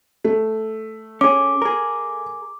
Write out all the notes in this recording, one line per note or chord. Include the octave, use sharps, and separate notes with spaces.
A3
C#4 G#4 D6
G#4 A#4